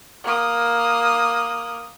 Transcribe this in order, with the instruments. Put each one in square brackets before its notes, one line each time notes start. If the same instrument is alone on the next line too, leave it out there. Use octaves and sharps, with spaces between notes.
[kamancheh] A#3 D#6